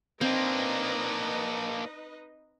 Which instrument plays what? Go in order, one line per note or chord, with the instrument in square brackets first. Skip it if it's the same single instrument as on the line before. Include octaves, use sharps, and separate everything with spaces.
[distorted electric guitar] A#3 D4 [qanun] C4 [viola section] D#4 B4 D#5